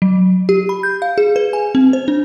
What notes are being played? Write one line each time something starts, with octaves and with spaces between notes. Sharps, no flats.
F#3
G4
B5
G6
F5
G#4
B4
G#5
C4
C5
D4